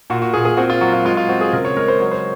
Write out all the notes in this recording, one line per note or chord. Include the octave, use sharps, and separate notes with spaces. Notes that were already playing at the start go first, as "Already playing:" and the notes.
A#2 F#4
F#4
A#2 G#4
G#4
C4 F#4
F4
F#3 F#4
F4
G#3 F4
F4
C4 F#4
G#4
C#3 A#4
C#5
G#3 A#4
C5
F#3 C#5
C5